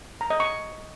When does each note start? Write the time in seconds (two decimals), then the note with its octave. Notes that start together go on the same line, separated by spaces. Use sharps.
0.21 A#5
0.30 D#5
0.40 C#6